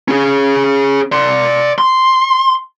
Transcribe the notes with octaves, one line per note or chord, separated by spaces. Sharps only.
C#4 G#4
D5 C6
C6